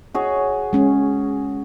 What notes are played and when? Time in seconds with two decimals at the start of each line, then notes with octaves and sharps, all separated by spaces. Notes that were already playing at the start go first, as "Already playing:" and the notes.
0.14 F#4 G#4 C#5
0.73 G#3 C#4